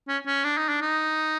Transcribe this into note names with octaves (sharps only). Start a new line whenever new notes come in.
C#4
C#4
D4
D#4
D4
D#4